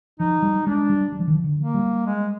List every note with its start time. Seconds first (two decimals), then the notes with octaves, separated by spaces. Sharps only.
0.19 F3 D#4
0.42 G3
0.66 G#3 D4
0.89 G3
1.12 G3
1.19 F3
1.28 D#3
1.35 F3
1.44 D3
1.59 A#3
1.74 G3
2.06 G#3